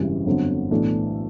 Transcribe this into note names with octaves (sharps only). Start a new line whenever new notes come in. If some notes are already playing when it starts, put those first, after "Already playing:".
Already playing: G#1 F#2 C#3 E3 G3
G1 F2 D3 F#3
B1 A2 E3 A3 D4